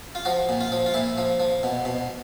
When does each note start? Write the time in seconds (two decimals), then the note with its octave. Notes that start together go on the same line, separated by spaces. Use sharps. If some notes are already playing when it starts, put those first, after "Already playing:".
0.15 F4
0.25 F3 F#4
0.49 A#2
0.61 F4
0.72 F3
0.86 F4
0.94 A#2 E4
1.18 F3
1.40 F3
1.63 B2
1.85 B2